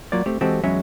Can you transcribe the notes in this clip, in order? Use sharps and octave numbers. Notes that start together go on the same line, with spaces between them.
F#3 A#3 F4 D5
A3 C4 G4
E3 G#3 C4 F#4 G4 A4
E2 F#3 G#3 C#4 E5